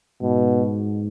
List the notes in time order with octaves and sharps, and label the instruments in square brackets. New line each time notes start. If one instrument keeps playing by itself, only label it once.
[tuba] G#2 [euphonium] B2